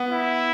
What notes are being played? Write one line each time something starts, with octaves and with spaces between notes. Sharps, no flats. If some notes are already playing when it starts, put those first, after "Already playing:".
Already playing: B3
E4